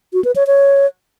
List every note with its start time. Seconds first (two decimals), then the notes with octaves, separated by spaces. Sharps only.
0.13 F#4
0.24 B4
0.36 C#5
0.47 C#5